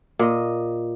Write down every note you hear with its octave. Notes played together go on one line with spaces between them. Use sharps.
A#2 D#5